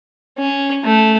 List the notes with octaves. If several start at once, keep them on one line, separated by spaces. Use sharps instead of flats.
C#4
A3